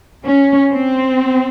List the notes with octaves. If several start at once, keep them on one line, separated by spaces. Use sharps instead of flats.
C#4
C4